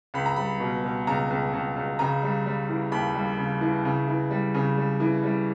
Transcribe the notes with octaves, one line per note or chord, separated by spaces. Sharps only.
C#2 B5
A#5
G3 B5
B2
B2
C#2 A#5
C#2
C#2
C#2
C#3 A#5
G3
G3
E3
D#2 B5
G3
C#3
E3
C#3
E3
G3
C#3
G3
E3
G3